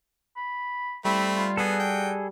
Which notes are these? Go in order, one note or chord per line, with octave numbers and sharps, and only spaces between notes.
B5
G3 A3 C4 E4 B5
F4
B3 F#4 G#4 A4
G5